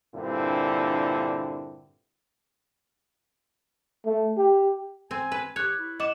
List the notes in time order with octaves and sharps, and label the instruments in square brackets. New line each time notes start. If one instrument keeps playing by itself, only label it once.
[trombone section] G2 A#2 D3 C4 E4
[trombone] A3
G4
[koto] C4 [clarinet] G#5
[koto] B4
[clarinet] G4 [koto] C#5 [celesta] F#6 G#6
[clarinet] E4
[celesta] D#5 D6 E7 [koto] F#5